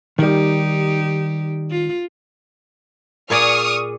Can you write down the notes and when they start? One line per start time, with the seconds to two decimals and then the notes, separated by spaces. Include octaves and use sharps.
0.19 D#3 G3 D#4 G4
1.70 F4
3.30 A#2 G#4 D5 C#6 D#6 F6